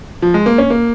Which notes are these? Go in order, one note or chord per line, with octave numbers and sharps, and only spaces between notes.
F3
G#3
A#3
C#4
A#3